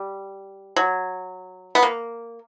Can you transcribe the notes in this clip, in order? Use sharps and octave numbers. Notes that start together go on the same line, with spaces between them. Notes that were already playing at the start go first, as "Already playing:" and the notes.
Already playing: G3
F#3
B3
A#3